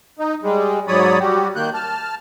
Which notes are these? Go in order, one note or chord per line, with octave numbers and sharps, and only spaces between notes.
D#4
G3 G#3
G#2 F#3 C#5 D5 B5 D#6
G3 F#4 G4
D#3 A#3 F#6 G6
A5 F6